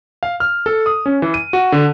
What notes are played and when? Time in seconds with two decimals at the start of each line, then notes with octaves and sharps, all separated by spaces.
0.23 F5
0.40 F6
0.66 A4
0.86 D#6
1.06 C#4
1.22 E3
1.34 D#7
1.53 F#4
1.72 D3